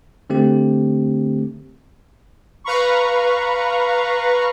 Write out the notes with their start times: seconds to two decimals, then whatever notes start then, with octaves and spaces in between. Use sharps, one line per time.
0.30 D3 A3 C4 G4
2.64 B4 F5 A#5 B5 C#6